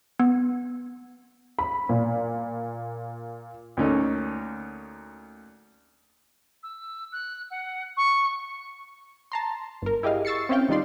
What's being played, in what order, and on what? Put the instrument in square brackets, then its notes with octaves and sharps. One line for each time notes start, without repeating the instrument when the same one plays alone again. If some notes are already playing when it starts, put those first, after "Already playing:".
[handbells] B3
[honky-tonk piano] B5
A#2
[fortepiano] D2 A#3 C#4 D#4 A4
[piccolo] E6
F#6
F#5
C#6
[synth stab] A5 A#5 C6
G1 A#4
E4 G4 G#4 D#5 F5
C#6 E6 A6 C7 C#7
C4 C#4 E4 F5 G5
D#3 G3 D#4 F4 D5 C6